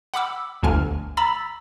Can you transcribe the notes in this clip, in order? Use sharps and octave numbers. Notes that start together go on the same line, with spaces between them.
F#5 B5 D6 E6
G1 D2 G#5 F6
A#5 B5 E6 A6 B6